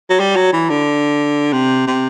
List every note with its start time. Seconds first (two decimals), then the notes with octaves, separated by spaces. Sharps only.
0.10 F#3
0.20 G3
0.36 F#3
0.53 E3
0.70 D3
1.53 C3
1.87 C3